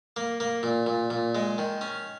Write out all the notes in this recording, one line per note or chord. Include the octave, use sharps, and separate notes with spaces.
A#3
A#3
A#2
A#2
A#2
G#3
D#3
C#4